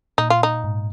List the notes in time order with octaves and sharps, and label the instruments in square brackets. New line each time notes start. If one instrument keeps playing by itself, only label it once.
[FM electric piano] A#2 [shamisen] D#4
[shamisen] F4
D#4
[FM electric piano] G#2